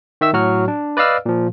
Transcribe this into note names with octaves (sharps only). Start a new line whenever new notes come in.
D#3 E5 E6
A2 F#3 F#4 F6
D4
B4 D5 D#5 F5 E6 F6
A#2 F3